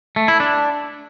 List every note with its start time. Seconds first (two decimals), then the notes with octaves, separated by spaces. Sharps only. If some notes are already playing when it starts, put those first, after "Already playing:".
0.16 A3
0.28 E4
0.40 D4